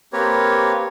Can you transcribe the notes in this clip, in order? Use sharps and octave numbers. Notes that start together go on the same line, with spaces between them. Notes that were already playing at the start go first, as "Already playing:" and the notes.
A#3 C4 G4 A#4 B4 C#5